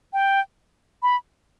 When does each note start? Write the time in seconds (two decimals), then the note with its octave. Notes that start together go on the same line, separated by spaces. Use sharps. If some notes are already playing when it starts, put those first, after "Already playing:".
0.13 G5
1.03 B5